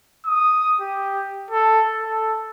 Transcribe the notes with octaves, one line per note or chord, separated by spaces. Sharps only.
D#6
G4
A4
A4